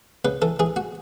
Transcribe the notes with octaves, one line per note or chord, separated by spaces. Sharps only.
C#3 B4
E3 A4
E3 G#4
F#4